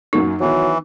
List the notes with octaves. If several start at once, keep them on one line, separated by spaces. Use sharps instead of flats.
F#2 F#3 A#3 D#4
D#3 E3 F#3 B3